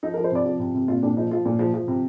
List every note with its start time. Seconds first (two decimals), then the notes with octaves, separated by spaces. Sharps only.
0.03 F3 D#4
0.14 A#4
0.17 F3
0.24 C5
0.32 C3 D5
0.46 F3
0.60 C3
0.74 C3
0.88 A#2 F4
1.03 A#2 D4
1.17 F3 D#4
1.31 F3 F4
1.45 A#2
1.59 F3
1.74 F3
1.88 C3